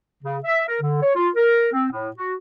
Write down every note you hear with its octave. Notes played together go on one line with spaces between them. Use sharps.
C#3
E5
A#4
D3
C#5
F4
A#4
C4
A2
F#4